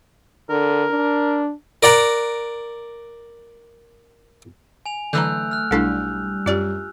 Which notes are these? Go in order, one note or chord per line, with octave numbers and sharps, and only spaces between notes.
D3 A#4
D4
A#4 D5 F#5 A#5
G#5 F7
D3 E3 F#3 A3 A#5 E6 F#6 G6
F6 F#6
B1 G3 A3 D4 E4 A4
F#2 F4 G4 D5